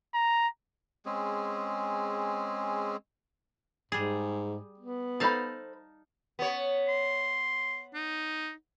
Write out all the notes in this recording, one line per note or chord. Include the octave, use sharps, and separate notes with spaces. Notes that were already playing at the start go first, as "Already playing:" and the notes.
A#5
G#3 C4 C#4 G#4
G#2 G3 G#4
B3
D#4 A4 C5 F5 A5 B5
B3 C#5
C6
D#4